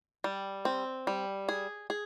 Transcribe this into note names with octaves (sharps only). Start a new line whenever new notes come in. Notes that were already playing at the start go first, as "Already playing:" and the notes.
G3
C4
G3
G#4
G#4